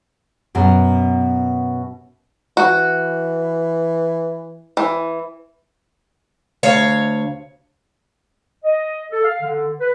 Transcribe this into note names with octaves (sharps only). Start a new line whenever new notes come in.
F#2 B2 A#4
E3 F#4
E3
D2 C#5 F5
D#5
A4
F5
D3
B4